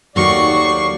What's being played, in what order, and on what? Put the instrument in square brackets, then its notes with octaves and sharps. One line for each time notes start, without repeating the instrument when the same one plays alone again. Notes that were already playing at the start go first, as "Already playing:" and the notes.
[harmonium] D#2 D5 [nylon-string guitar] D#3 F#3 A3 [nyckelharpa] F#4 [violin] C#6 C7